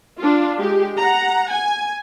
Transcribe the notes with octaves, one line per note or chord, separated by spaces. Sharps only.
D4 F4
G#3 G4
F#5 A#5
G#5